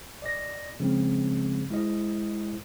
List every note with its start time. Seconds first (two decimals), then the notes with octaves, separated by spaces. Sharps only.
0.22 D5 D#5 A#6
0.80 C#3 F3 G#3 C4
1.70 G#3 E4 C5 D#5